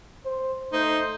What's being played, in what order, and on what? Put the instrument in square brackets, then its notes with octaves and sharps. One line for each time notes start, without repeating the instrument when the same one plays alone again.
[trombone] C5
[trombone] A3 [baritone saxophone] D#4 [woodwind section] C5